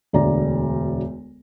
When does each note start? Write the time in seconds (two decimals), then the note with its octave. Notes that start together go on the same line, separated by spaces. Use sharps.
0.13 E1 D2 D5 A#5